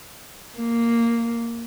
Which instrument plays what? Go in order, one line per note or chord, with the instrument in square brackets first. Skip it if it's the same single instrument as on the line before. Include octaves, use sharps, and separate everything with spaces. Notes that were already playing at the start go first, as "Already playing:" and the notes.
[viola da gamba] A#3